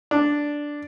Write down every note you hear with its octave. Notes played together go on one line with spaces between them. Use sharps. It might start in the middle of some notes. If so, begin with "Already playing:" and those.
D4